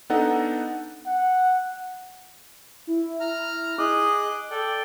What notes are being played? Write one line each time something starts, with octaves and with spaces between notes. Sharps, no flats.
B3 D4 D#4 A4 D#5 F#5
F#5
E4
A#5 F6
G#4 D#5 D6 F#6
A4 D5 G5